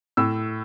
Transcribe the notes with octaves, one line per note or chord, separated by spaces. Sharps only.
A2 E6